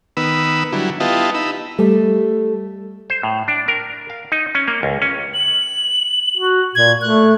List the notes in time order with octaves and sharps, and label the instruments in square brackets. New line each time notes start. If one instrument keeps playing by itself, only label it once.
[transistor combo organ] D#3 B3 B5 E6
D3 F#3 G3 E4
B3 E4 F4 G4 D#5 A5
D#4 B5 E6
[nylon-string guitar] G3 A3
[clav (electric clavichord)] C5
A2
D4
A#4
F5
D#4
C#4
A#3
C#2
C#4
[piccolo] F#7
[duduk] F#4
[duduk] A#2 [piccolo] G#6
[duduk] A3 [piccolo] F#6